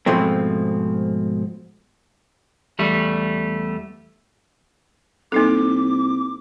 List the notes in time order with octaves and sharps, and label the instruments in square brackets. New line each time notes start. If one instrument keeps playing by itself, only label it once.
[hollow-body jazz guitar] G#2 B2 F3 A3 C4
[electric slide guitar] E2 G3 A3
[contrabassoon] C2 [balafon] A#3 D#4 A4 [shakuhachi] D6